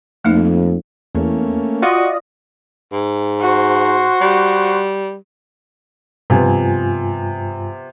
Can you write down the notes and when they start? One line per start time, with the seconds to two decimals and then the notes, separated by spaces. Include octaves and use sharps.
0.25 F2 A3 A#3 D#4
1.15 E2 A3 A#3 C#4
1.82 F4 F#4 D5 D#5
2.92 G#2
3.41 F#4 C5
4.21 G3
6.30 G2 C3 F3 B3 F4 G#5